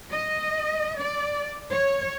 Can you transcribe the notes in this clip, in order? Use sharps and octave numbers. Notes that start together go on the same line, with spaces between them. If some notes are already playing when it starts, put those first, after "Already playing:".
D#5
D5
C#5